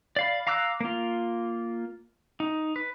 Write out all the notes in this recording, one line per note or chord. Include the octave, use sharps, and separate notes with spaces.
D5 F5 B5
F5 A#5 D6 E6 F#6
A#3 F4
D#4
B4